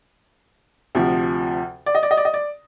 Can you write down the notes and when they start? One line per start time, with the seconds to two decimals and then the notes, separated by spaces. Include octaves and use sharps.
0.95 D2 C3 F3
1.86 D5
1.95 D#5
2.03 D5
2.11 D#5
2.17 D5
2.25 D#5
2.34 D5